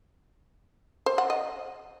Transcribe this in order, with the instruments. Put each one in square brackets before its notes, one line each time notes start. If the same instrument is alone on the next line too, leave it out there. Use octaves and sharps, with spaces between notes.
[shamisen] C5
F#5
D#5